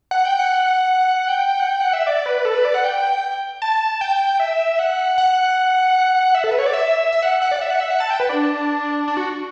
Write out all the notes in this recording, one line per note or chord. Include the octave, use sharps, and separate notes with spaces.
F#5
G5
F#5
G5
F#5
G5
F#5
E5
D5
B4
A4
B4
D5
F#5
G5
A5
G5
E5
F#5
F#5
E5
A4
B4
C#5
D5
E5
E5
F#5
F#5
D5
F#5
E5
F#5
E5
F#5
A5
G5
B4
D4
D4
F#4